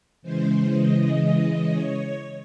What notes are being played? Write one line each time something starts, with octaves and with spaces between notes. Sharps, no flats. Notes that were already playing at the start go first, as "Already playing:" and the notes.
C#3 E3 G#3 C5
D#5
C#5